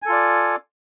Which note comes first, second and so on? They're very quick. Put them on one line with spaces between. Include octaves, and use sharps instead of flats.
G#5 A4 F4 D5